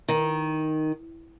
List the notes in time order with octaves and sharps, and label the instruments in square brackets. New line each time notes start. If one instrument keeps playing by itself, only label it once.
[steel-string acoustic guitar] D#3